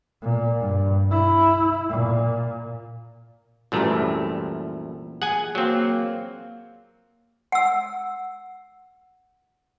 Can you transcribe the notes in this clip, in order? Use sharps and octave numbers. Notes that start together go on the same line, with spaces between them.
A#2
G2
E4
A#2
C2 F#2 A#2 E3 G3 A3
G#4 F#5 G#5
F#3 A#3 C4
F#5 E6